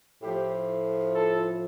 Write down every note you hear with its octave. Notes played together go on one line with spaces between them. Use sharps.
A2 F3 G4
A4